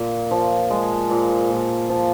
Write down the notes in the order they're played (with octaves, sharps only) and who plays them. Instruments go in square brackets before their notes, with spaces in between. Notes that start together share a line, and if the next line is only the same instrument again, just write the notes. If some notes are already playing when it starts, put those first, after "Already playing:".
Already playing: [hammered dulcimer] A#2
F3
G#3
A#2
A#2
F3